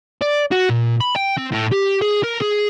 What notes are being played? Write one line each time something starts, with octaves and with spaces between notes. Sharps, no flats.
D5
F#4
A#2
B5
G5
C4
A2
G4
G#4
A#4
G#4